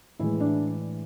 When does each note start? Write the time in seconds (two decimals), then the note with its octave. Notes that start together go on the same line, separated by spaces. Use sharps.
0.19 A2 E3 G#3 E4
0.40 D4